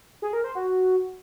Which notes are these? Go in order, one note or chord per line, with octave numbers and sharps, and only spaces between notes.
G#4
A#4
C5
F#4